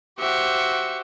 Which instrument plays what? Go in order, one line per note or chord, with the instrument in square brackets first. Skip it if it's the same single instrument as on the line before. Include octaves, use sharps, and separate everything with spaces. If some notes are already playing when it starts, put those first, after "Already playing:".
[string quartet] F#4 G4 C5 [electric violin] E5 C#7